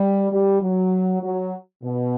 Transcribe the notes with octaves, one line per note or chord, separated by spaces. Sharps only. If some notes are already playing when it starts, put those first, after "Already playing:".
Already playing: G3
G3
F#3
F#3
B2